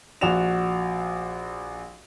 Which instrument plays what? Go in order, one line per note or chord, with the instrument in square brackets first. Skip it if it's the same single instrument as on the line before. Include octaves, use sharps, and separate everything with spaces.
[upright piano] A#1 F#4 D5 E7 F7